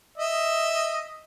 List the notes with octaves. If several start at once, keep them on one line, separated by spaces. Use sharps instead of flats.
D#5 E5